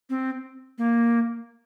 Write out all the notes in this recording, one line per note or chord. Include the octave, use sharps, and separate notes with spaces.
C4
A#3